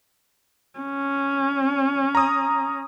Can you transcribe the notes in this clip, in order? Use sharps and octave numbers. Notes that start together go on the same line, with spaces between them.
C#4
A#5 D#6